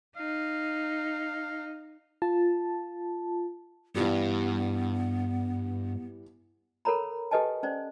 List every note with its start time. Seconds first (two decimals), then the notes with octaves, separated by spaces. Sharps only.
0.17 D#4 F5
2.22 F4 A5
3.95 G2 E3 G3 B3
6.85 A4 A#4 C#5 A#5 B5
7.31 G4 A4 B4 D#5 G#5 A5
7.63 C#4 C5 D5